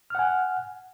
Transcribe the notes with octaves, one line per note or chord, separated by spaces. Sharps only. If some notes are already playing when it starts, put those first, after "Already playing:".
F#5 G#5 F6